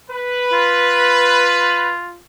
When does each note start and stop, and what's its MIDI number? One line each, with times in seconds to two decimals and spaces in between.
0.10 1.92 71
0.53 2.21 65